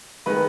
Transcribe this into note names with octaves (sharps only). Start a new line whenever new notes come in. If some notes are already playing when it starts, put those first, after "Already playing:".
D#3 G#3 B4